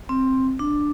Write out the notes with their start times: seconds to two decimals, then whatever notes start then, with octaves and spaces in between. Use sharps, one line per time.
0.09 C4
0.59 D4